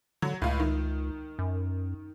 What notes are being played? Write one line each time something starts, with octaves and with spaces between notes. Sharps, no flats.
D3 F#3
C#2 A2 F4
D#3
F#2